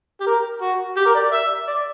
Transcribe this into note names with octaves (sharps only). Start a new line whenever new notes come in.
G4
A#4
F#4
G4
A#4
D5
E5
D5